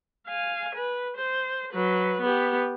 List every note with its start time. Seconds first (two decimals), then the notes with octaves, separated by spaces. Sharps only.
0.28 F5 G#5
0.75 B4
1.17 C5
1.73 F#3 B4
2.21 B3 G4